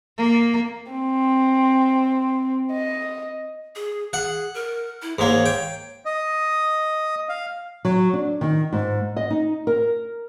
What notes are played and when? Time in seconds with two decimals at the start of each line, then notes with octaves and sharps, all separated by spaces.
0.18 A#3
0.92 C4
2.72 D#5
3.76 G#4
4.13 G#4 F#5
4.54 A#4
5.02 E4
5.19 G#2 A#3 C#5
5.46 G5
6.05 D#5
7.29 F5
7.85 F#3
8.13 D4
8.41 D#3
8.73 G#2
9.16 D#5
9.30 D#4
9.67 A#4